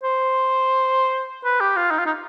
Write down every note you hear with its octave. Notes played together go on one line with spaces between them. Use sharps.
C5
B4
G4
F4
D#4
F4
D#4